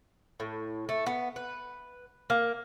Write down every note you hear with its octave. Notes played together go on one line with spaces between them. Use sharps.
A2
A3
B3
B4
A#3